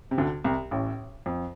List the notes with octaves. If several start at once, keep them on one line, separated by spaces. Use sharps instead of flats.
C3
D2 D3
C2 C3
A1 A2
F2